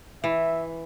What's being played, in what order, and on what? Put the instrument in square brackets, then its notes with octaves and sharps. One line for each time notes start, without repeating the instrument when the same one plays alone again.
[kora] E3 [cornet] E5